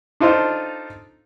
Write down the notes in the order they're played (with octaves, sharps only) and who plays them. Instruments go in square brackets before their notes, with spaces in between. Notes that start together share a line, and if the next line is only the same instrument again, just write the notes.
[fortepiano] D4 D#4 F4 A4 C5 F5